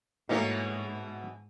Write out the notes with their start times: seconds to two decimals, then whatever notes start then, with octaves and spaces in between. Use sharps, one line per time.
0.29 G#2 B2 E3 A3 A#3 D#4 E4 C#5